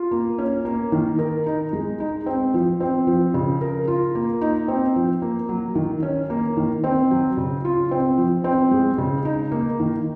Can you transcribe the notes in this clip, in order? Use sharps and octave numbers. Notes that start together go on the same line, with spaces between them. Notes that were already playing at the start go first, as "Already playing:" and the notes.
Already playing: F4
A#3
C#4
A#3
D#3
A#4
D#4
G#3
D#4
C4
F3
C4
F3
C#3
A#4
F4
A#3
D#4
C4
F3
A#3
F#3
D#3
C#4
A#3
D#3
C4
F#3
C#3
F4
C4
F3
C4
G#3
C#3
D#4
A#3
D#3